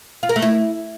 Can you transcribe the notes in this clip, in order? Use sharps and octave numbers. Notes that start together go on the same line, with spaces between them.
F4
A#4
A3
E4